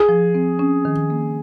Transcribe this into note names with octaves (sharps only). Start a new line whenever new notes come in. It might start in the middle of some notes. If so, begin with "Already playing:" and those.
Already playing: G#4
F3
C4
C#4
D#3
A#3